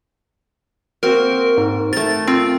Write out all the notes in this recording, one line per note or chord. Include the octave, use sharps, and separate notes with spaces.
A#3 C4 F#4 A#4
G#2
A3 A#4 A6
C4 F4